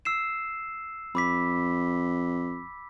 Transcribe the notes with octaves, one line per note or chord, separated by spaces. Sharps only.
E6 C7 E7
F2 B5 D6 B6